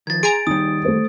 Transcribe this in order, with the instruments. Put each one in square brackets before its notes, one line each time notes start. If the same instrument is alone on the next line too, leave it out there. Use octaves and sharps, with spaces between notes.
[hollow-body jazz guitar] D#3 F3 [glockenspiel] G#6 A6
[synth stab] G#4 G#5 A#5 [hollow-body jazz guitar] C6 [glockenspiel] D7
[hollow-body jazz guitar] D#3 G3 [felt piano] D#4 [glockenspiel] D#6
[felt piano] A3 C5